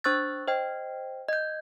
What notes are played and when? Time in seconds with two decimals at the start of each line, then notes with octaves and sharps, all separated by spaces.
0.04 D4 C5 C#6 E6 F#6 A6
0.47 C5 D#5 G5
1.28 D#5 G6